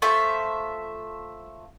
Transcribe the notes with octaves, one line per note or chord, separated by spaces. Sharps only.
A3 F4 C5 E5